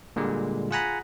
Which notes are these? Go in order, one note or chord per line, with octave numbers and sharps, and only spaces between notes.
A#2 D3 G3 G#3
F4 G#4 F#5 G#5 A#5 B5